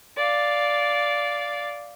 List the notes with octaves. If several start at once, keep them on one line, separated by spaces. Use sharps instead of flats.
D5 F5